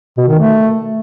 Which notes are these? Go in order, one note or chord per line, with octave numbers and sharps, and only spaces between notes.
B2
D#3
A3